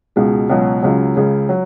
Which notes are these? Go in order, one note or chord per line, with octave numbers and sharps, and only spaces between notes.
C#2 B2 G#3
C#2 B2 F#3
C#2 C#3 F#3
C#2 C#3 G#3
F#3